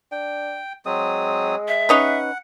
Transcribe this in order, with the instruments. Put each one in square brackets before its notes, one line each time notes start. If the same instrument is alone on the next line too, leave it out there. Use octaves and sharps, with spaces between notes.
[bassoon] D4 [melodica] G5
[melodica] F#3 C4 D#6 [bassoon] G#3
[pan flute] E5
[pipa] C#4 D#4 B4 [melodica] F#5